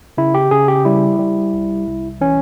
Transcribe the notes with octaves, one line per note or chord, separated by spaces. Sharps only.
C#3 E4
G4
C#3 G#4
G4
G3 E4
G3
C2
C2
E3 C#4